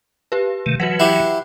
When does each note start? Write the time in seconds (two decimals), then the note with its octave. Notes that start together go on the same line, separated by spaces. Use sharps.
0.32 G4 B4
0.66 C3 D#3 A3
0.80 E3 F#3 F#4 B4 F#5
1.00 E4 G4 F#5 F#6 C7